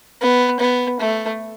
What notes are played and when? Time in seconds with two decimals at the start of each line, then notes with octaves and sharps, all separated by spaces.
0.22 B3
0.60 B3
1.00 A3